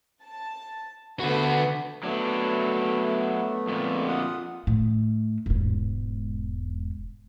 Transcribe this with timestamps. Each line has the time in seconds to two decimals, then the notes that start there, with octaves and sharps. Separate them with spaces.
0.23 A5
1.20 D3 B3 F#4 A4 B5
2.03 F#3 A3 B3 D4
3.68 F2 A#2
4.08 F4 F#5 D#6
4.67 A2
5.46 E1 G#2